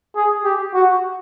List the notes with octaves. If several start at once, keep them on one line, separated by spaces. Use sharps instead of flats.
G#4
G4
F#4